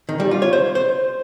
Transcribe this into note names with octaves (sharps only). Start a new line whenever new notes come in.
D#3
G3
F4
C#5
C5
C5